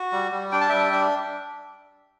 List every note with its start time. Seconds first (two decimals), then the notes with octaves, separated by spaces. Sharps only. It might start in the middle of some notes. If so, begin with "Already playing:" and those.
Already playing: F#4
0.12 G3
0.32 G3
0.52 D4 G5
0.61 A5
0.69 G3 E5 G5
0.92 D4